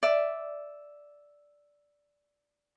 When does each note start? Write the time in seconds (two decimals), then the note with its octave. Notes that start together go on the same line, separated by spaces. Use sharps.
0.03 D5 E5